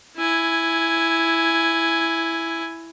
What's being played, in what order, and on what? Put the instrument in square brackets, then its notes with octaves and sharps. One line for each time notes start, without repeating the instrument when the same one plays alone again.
[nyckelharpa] E4 G#5